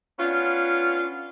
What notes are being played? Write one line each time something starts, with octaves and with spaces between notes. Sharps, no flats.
B3 C#4 D4 F4